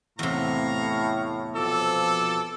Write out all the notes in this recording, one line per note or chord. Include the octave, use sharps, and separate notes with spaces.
E2 A2 C3 F5 A#5 C#6
F2 B2 F3 A4 D6 E6